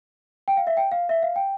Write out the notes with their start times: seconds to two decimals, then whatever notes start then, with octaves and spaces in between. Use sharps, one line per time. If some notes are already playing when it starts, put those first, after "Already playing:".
0.48 G5
0.57 F5
0.67 E5
0.77 G5
0.92 F5
1.09 E5
1.23 F5
1.36 G5